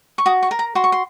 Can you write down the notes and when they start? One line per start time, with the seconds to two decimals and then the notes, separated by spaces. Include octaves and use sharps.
0.18 C#6
0.26 F#4 D#6
0.42 C#6
0.51 A#4
0.59 A#5
0.75 F#4 C6
0.84 C#6
0.92 C6